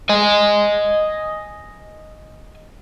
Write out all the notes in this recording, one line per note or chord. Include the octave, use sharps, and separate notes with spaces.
D#5 G#5